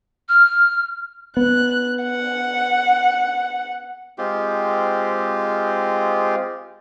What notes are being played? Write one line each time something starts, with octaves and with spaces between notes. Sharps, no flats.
F6
B3 F#6
F#5
G#3 C4 F4 G4